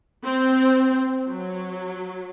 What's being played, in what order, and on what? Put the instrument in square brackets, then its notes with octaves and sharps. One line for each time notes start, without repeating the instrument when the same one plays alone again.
[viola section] C4
F#3